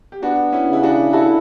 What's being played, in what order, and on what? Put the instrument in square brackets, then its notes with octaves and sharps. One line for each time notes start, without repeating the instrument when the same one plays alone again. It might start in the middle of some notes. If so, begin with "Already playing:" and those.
[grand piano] G4
[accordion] B3 [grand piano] D4 F#4
[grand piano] C#4 E4
[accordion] C#3 [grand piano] E4
[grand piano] D4 F#4
[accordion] E4 [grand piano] F#4 A4